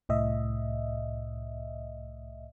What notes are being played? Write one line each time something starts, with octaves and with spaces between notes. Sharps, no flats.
C2 A2 D#5 E5